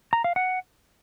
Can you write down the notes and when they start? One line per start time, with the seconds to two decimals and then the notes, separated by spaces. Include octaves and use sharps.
0.13 A#5
0.24 F5
0.36 F#5